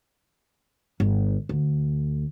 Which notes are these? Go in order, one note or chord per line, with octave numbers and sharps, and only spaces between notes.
G1
D2